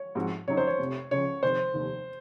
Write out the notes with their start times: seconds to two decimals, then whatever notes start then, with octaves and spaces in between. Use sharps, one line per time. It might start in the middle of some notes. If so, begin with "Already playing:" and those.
Already playing: C#5
0.15 G#2 F3 C4 F#4
0.48 F2 C#3 F#3 C4 D#4 C#5
0.57 C5
0.67 C#5
0.78 F1 F2 C3
1.11 C#2 C#3 F3 C#5
1.43 F1 F2 D#3 C5
1.74 F1 D#2 D#3